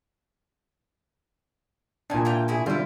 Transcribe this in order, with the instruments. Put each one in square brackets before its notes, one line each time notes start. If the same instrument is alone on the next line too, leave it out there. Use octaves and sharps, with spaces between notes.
[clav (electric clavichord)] A#2 D4 [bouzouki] D#3 G#5
[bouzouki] E3 F4 G5
B2 E4 G#4
[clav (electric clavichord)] D3 G3 [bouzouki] E4 F4